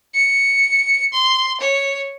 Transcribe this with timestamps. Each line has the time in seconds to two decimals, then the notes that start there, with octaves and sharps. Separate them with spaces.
0.14 C#7
1.13 C6
1.61 C#5